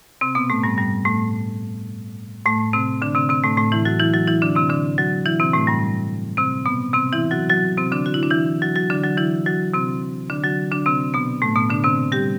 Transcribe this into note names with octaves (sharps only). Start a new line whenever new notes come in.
C3 C4
B2 B3
A2 A3
G2 G3
G2 G3
A2 A3
A2 A3
C3 C4
D3 D4
C3 C4
C3 C4
A2 A3
A2 A3
E3 E4
F#3 F#4
E3 E4
F#3 F#4
E3 E4
D3 D4
C3 C4
D3 D4
F#3 F#4
E3 E4
C3 C4
A2 A3
G2 G3
C3 C4
B2 B3
C3 C4
E3 E4
F#3 F#4
F#3 F#4
C3 C4
D3 D4
F#4
E4
D4
E3 E4
F#3 F#4
F#3 F#4
D3 D4
F#3 F#4
E3 E4
F#3 F#4
C3 C4
D3 D4
F#3 F#4
D3 D4
C3 C4
B2 B3
A2 A3
B2 B3
D3 D4
C3 C4
G3 G4